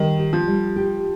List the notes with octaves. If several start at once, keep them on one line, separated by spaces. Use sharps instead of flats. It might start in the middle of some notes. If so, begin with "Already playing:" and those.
Already playing: D#3 G3
G4
F3
G3
G4